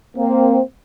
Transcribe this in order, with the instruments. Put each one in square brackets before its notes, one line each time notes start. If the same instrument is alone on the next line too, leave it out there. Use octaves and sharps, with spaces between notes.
[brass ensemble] A#3 C4